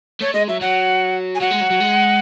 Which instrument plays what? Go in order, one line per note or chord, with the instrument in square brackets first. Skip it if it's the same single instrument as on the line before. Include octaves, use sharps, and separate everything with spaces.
[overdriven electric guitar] A3 [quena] C#5
[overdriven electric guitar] G#3 [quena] D#5
[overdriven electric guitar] F#3 [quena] E5
[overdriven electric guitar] F#3 [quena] F#5
[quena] G#5
[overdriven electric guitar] F#3 [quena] F#5
[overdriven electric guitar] G#3
F#3
F#3
G#3